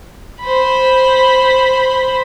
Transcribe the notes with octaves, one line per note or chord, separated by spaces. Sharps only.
C5 B5